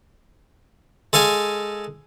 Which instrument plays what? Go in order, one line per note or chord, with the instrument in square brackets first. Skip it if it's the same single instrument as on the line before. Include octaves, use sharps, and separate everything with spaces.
[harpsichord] G#3 A4 F5 G#5